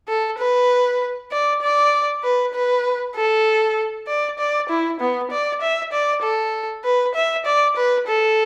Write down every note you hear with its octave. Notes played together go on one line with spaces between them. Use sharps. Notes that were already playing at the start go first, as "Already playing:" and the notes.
A4
B4
D5
D5
B4
B4
A4
D5
D5
E4
B3
D5
E5
D5
A4
B4
E5
D5
B4
A4